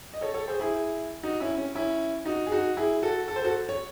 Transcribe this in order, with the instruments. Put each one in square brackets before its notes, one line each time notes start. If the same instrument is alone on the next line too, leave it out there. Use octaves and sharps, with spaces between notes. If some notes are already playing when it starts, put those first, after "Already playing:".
[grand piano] D#5
A4 C#5
A4 C#5
G#4 C5
E4 G#4
D#4 F#4
C#4 E4
C#4
C#4 E4
D#4 F#4
G#4
D#4 F#4
E4 G#4
F#4 A4
A4
C5
F#4 A4
C#5